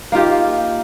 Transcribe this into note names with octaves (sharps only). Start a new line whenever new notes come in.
A#3 D#4 F4 G4